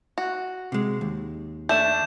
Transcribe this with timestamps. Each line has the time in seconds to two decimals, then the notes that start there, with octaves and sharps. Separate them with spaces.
0.18 F#4
0.72 C3 G#3
1.01 D#2
1.69 A3 D4 G6 E7